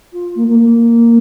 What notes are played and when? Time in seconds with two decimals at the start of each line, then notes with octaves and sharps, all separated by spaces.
0.13 F4
0.35 A#3
0.48 A#3
0.59 A#3